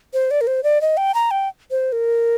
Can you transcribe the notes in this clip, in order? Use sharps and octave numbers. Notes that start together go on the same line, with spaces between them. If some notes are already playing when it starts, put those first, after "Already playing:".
C5
D5
A#4
C5
D5
D#5
G5
A#5
G5
C5
A#4